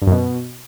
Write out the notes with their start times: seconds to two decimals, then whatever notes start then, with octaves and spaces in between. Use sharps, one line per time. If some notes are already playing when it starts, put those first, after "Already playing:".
0.02 G2
0.07 F#2
0.12 B2